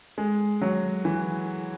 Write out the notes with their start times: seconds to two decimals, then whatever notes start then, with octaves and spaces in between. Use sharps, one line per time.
0.18 G#3
0.62 F#3
1.05 E3